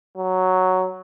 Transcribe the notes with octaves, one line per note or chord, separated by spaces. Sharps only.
F#3